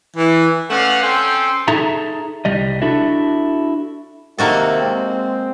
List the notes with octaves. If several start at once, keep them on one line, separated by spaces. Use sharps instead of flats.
E3
A3 C#4 B4 D5 F5 F#5
C4 C#4 A4 G5 C6
D#4 G#4 A4 E5 A#5
C2 G3 D#5
D4 E4 F#4 A4 E5
C3 D#3 A#3 F#4 A4
G#3 C4